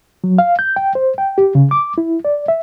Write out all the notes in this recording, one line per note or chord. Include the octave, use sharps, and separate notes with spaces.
F#3
F5
G6
G5
C5
G5
G4
C#3
D6
E4
D5
E5